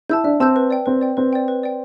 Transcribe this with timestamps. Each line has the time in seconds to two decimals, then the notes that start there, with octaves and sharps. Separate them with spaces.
0.09 E4 A5 E6 G6
0.24 D4 E5
0.40 C4 A5 E6 G6
0.56 B4
0.70 D5 G5
0.86 C4 B4
1.01 D5 G5
1.17 C4 B4
1.33 D5 G5
1.48 B4
1.63 D5 G5